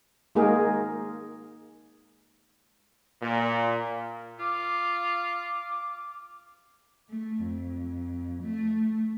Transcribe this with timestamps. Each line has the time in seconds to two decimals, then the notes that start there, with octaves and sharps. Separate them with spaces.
0.35 G#3 A#3 D#4 F#4 G#4 A#4
3.21 A#2
4.39 F4 D6
7.09 A3
7.43 F2
8.42 A3